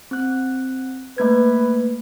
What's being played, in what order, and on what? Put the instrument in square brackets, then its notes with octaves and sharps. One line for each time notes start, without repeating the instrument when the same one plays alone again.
[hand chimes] C4 F#6
[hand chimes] A3 A#3 G#6 [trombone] B4